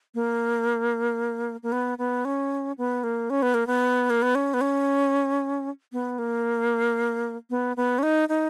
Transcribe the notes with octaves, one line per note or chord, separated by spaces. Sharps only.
A#3
A#3
B3
B3
C#4
B3
A#3
C#4
B3
A#3
B3
A#3
B3
C#4
B3
C#4
B3
A#3
B3
B3
C#4
D#4
D#4